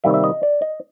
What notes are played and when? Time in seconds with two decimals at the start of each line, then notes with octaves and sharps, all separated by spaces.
0.04 C3 D#3 G3 A#3 E5
0.14 E5
0.24 D#5
0.43 D5
0.62 D#5